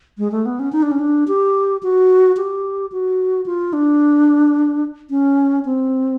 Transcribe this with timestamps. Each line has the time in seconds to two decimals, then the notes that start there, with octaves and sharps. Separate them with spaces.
0.18 G#3
0.32 A3
0.45 B3
0.59 C#4
0.72 D#4
0.82 D4
0.91 C#4
0.99 D4
1.28 G4
1.83 F#4
2.37 G4
2.92 F#4
3.46 F4
3.73 D4
5.10 C#4
5.65 C4